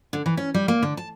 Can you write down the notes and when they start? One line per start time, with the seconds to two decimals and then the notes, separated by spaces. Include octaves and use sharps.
0.13 D3
0.26 E3
0.37 C#4
0.54 G3
0.68 A#3
0.82 D3
0.97 A5